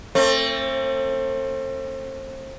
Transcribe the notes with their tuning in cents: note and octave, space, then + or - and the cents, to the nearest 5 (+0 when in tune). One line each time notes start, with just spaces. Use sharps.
A3 +35 C4 +35